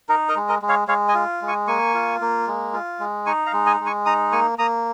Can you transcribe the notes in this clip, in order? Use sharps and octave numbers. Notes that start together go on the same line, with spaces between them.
D#4 A#4
A#4 D#5
G#3
A#4 D#5
G#3
C#5 F5
G#3 C#5 F5
D#5 G#5
F4
G#3
G#5 C#6
A#3 G#5 C#6
F4
A#3
G#3
F4
G#3
D#4 G#5 C#6
F5 A#5
G#3
D#5 G#5
G#3
G#5 C#6
D#4 A#5 D#6
A#3 G#5 C#6
A#3 A#5 D#6